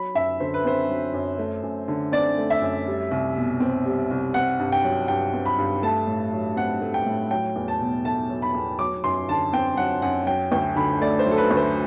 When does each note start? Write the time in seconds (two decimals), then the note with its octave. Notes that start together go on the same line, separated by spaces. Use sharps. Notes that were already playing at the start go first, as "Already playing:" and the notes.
Already playing: F#3 B5
0.15 F#2 E5
0.40 D3 C5
0.54 B4
0.65 C4 C5
0.89 F#3
1.14 F#2
1.39 A3
1.63 F#2
1.88 D3
2.12 C4 D5
2.38 A3
2.50 E5
2.62 F#2
2.87 G3
3.11 C2
3.36 B2
3.60 C4
3.85 G3
4.10 C2
4.34 C4 F#5
4.59 G2
4.72 G5
4.84 F#3
5.08 G2 G5
5.33 C4
5.46 B5
5.58 G2
5.83 A3 A5
6.07 A2
6.32 F#3
6.57 C4 F#5
6.81 A3
6.94 G5
7.06 A2
7.31 F#3 G5
7.56 E2
7.68 A5
7.80 B2
8.05 A3 A5
8.30 F#3
8.42 B5
8.54 E2
8.79 F#3 D6
9.04 F#2 C6
9.29 D3 A5
9.53 C4 G5
9.77 F#3 F#5
10.02 F#2 F#5
10.26 F#3 G5
10.52 D2 G5
10.76 D3 B5
11.01 A3 D5
11.19 C5
11.26 F#3
11.31 A4
11.38 B4
11.51 D2
11.57 C5